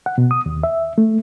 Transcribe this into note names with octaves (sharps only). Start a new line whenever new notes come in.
F#5
B2
D#6
D#2
E5
A3